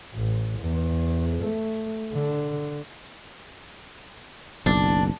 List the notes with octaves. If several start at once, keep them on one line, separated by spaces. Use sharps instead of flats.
A1
E2
A3
D3
F#1 B1 D4